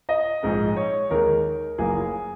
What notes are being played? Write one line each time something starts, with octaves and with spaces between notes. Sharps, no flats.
D#5
A#1 G#2 G#3
C#5
D#2 D#3 G#3 A#4
F#1 F#2 F#3 A#3 G#4